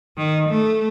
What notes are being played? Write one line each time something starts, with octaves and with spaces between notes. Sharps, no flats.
D#3
A3